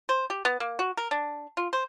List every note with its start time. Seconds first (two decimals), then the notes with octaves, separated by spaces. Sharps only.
0.09 C5
0.30 G4
0.45 B3
0.60 A#3
0.79 F#4
0.97 A#4
1.11 D4
1.57 F4
1.73 C5